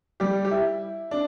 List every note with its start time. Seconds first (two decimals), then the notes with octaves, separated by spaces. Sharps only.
0.20 G3 G4
0.45 G4
0.51 E4
1.11 D4